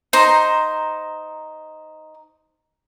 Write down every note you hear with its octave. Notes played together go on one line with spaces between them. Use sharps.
D#4 C5 A#5